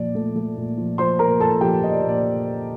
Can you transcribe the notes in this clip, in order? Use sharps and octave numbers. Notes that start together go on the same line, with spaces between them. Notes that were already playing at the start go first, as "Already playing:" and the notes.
Already playing: A#2 F3 D5
A3
A3
A#2
F3
F3 C5 C6
A#2 A#4 A#5
A#2 A4 A5
F3 G4 G5
F3 D#5
D5
A#2
D5